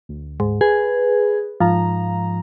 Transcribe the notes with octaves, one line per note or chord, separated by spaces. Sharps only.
D2
G#2
G#4 B4
G#2 F3 A#5